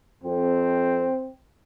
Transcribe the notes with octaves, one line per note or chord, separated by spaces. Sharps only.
F2 C4